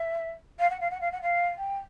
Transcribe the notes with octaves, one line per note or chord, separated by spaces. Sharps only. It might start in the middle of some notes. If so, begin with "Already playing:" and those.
Already playing: E5
F5
F#5
F5
F#5
F5
F#5
F5
G5